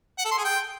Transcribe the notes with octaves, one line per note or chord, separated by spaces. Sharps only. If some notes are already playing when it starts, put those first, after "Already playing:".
F#5
A4
C6
G#4
G5